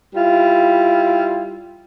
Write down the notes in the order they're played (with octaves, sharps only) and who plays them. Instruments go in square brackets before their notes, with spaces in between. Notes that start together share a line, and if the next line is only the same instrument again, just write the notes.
[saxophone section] G3 E4 F4